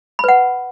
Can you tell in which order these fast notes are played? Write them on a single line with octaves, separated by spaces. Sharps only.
B5 B4 F#5